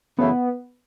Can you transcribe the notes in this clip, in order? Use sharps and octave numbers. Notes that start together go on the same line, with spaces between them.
F#2 C#3 E3 A3 B3 E4